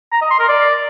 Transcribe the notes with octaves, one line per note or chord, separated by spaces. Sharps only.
A#5
D#5
C6
A#4
D5